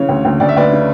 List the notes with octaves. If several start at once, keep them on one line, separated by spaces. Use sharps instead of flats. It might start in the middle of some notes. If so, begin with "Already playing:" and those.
Already playing: C#3 E3 C#5
D2
D2
D2 D5
E5
D2 B4 D5
C#3